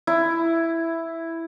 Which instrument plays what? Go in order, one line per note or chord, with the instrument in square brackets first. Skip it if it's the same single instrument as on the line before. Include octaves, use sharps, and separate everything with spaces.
[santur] E4